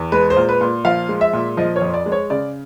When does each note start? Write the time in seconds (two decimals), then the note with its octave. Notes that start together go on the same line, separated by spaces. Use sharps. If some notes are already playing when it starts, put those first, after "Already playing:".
Already playing: E2
0.12 G#3 B4
0.30 C5
0.36 A#2
0.49 B4
0.61 A#2
0.85 F3 F5
1.09 G#3
1.21 E5
1.33 A#2
1.57 F3 D#5
1.76 C#5
1.82 F2
1.94 D5
2.06 G#3
2.12 C#5
2.30 C#3 D5